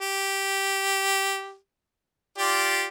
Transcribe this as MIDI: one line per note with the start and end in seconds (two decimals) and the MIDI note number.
0.01 1.56 67
2.38 2.86 65
2.38 2.86 67
2.38 2.86 74